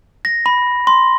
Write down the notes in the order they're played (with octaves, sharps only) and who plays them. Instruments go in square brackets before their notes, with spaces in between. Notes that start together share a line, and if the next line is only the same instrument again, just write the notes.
[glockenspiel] A#6
B5
C6